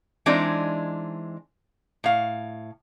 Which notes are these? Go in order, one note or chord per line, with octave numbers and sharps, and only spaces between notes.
E3 G#3 C4 D4 D#4
A2 F5